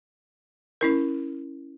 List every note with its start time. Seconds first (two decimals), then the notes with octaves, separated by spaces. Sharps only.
0.81 C#4 E4 A#4